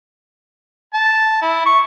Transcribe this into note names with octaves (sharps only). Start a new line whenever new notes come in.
A5
E4
C#6